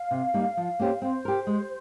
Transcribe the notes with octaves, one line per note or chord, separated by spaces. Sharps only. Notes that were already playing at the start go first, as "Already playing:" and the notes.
Already playing: F5
C3
G3 A#3 D#4
F3
A#3 C#4 G4 C5
C4 C5
G4 A#4
G#3